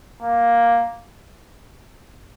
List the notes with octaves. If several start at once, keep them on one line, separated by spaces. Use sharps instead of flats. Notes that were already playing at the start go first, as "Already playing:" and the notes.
A#3